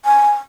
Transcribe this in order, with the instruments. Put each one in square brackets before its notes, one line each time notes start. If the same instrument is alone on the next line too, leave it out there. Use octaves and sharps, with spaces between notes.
[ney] G#5